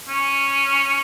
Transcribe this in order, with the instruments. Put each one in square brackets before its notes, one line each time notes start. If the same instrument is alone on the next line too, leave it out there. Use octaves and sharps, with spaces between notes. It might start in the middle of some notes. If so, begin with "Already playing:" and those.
[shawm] C#4